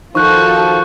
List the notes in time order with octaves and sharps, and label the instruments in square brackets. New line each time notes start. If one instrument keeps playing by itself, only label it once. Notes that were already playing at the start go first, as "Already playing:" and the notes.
[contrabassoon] D#3 [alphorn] F3 [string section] F4 F#4 A4 [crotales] C#6 F#6 G6